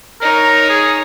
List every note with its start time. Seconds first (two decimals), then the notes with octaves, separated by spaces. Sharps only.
0.21 D#4 A#4 C#5
0.70 G#4